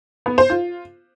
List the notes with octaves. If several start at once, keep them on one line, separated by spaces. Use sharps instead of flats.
B3
C5
F4